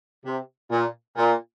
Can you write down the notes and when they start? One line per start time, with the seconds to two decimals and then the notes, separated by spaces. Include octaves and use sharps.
0.25 C3
0.71 A#2
1.17 A#2